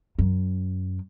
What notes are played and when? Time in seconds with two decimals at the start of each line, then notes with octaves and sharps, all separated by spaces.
0.19 F#2